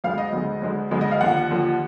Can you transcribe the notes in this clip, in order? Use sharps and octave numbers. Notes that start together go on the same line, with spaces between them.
D2 D3 G#3 F5
D#5
D2 D3 G#3
D2 D3 G#3
D2 D3 G#3
D#5
F5
D#2 D3 F3 F#5
D#2 D3 F3